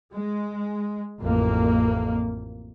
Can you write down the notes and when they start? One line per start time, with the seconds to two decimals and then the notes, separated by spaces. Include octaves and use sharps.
0.14 G#3
1.21 A1 F2 A#3